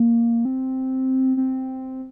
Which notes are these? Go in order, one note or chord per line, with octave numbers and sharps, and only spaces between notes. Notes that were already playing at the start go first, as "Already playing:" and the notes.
Already playing: A#3
C4
C4